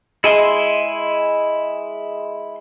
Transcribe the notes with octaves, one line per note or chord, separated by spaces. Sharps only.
G#3 E4 G#5 C6